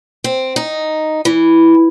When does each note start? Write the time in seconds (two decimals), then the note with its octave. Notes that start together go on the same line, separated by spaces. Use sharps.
0.24 C4
0.56 D#4
1.25 E3